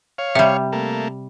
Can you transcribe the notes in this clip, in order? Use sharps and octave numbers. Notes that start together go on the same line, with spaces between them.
C#5 F5
C3 G3 E5
A3 A#3